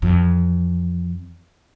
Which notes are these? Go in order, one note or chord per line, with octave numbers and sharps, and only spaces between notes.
F2 E3